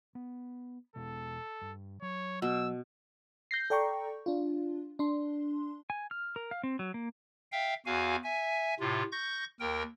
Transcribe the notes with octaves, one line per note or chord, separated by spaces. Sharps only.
B3
E2 B2 G#3 A4
G2
F#3 C#5
B2 E6
G6 A#6 C7
A4 D5 G5 A#5 C#6
D4 F4
D4 C6
G#5
F6
A#4
F5
C4
F#3
A#3
E5 F5 G5
E2 F#4 F5 G#5
E5 G#5
A2 C3 F4
C#6 G6 A#6
D#2 A#4 G5